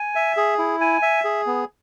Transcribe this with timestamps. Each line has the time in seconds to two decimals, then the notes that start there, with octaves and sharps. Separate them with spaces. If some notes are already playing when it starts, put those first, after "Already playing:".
Already playing: G#5
0.15 E5
0.37 G#4
0.58 E4
0.81 G#5
1.02 E5
1.24 G#4
1.46 B3